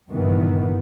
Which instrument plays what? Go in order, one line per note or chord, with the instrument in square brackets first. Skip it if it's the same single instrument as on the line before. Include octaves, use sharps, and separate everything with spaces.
[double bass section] F#1 G2 A#2 D#3 E3 B3